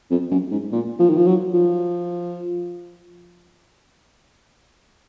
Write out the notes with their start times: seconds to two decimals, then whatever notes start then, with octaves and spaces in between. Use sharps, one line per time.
0.11 F2
0.31 F#2
0.51 G#2
0.72 A#2
0.99 F3
1.09 D#3
1.17 F3
1.26 F#3
1.54 F3